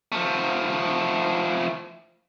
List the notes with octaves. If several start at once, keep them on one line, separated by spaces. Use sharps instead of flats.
F3 A3